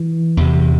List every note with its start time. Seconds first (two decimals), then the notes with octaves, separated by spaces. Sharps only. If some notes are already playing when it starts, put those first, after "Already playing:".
Already playing: E3
0.37 E2 C3